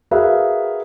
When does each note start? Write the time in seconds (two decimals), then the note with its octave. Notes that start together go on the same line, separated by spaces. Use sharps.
0.11 F#4 G#4 A#4 B4 E5 F5